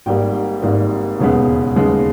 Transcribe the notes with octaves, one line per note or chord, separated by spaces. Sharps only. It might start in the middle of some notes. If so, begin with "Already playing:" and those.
G#1 G#2 G3 A#3 G5
G#1 G#2 G3 A#3
E1 D#2 C#3 G#3 B3
E1 D#2 C#3 G#3 B3